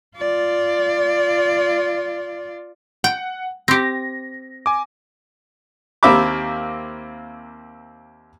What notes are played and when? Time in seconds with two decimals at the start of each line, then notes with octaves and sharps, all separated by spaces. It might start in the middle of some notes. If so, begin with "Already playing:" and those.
0.17 F4 D5
3.04 F#5 G5
3.68 C4 G4 A#6
4.66 G#5 D6
6.03 D#2 A#3 C4 E5 B5 D6